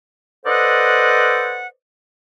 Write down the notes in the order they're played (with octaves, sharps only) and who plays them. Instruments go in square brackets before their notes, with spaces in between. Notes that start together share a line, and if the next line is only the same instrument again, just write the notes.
[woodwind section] A4 B4 C5 D5 D#5 F#5